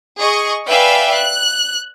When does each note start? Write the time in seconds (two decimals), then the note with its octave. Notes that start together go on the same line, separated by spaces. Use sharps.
0.19 G#4 D#5 C#6
0.68 B4 D5 E5 F5 G5 G#5
1.12 F#6